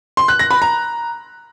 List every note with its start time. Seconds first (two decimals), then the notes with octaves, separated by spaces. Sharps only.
0.17 C6
0.28 F#6
0.39 A#6
0.51 B5
0.62 A#5